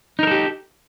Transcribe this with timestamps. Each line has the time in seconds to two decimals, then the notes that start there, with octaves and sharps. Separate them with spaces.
0.19 D#4
0.23 A#4
0.27 A4
0.31 G4